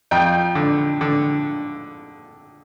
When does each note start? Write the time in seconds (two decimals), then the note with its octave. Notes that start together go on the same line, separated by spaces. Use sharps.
0.11 F2 G5
0.55 D3
1.01 D3